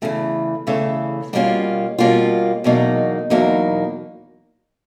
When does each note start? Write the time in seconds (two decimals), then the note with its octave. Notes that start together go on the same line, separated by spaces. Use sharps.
0.02 E2 C#3 E3 A3
0.67 E2 C#3 E3 A3
1.33 B2 G3 A#3 C#4 F4
1.98 B2 G3 A#3 C#4 F4
2.64 E2 B2 F#3 A#3 D#4
3.30 E2 B2 F#3 A#3 D#4